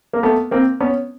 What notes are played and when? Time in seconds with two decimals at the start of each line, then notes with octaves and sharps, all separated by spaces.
0.13 A#3
0.23 A3 B3
0.51 A#3 C4
0.81 B3 C#4